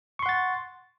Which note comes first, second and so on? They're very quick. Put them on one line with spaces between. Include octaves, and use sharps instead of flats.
C#6 C6 F#5 A6